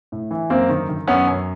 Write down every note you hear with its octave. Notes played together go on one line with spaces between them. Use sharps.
A2
E3
F#2 A#3 C4
D#3
D#3
F#2 B3 C#4
F#2